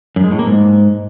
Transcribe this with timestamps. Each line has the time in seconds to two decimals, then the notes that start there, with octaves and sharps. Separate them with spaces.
0.16 F#2
0.24 G#3
0.31 A2
0.39 A#3
0.47 G#2